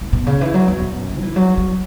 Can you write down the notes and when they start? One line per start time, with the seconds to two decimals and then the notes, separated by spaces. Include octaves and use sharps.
0.01 A2
0.13 B2
0.26 C#3
0.41 E3
0.54 F#3
0.68 E2
0.82 B2
0.96 F#2
1.09 A2
1.17 F#3
1.23 E3
1.36 F#3
1.57 F#3